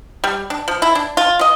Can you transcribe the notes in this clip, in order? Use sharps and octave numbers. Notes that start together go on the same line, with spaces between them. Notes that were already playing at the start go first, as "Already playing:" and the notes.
G3
D4
F3
E4
D4
F4
D#5